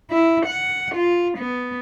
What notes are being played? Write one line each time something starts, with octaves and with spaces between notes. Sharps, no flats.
E4
F#5
F4
B3